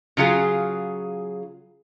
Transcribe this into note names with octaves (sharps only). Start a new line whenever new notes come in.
C#3 F#3 F4 G#4